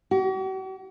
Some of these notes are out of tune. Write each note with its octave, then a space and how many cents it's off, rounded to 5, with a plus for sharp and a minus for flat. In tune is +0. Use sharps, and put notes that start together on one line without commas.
F#4 +45